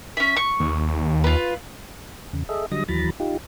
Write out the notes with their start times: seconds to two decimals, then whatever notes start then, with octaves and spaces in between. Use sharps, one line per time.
0.17 C#4 E5
0.37 C#6
0.60 D#2
1.24 F4 B4
2.33 E2 C#3
2.49 G#4 A4 D#5 E5
2.72 D3 F#3 G3 D#5 D#6 A#6
2.88 D#2 E3 F#3 A#5 B5 A6
3.20 D#4 F4 G4